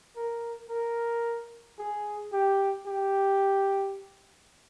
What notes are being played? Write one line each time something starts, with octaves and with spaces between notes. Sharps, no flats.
A#4
A#4
G#4
G4
G4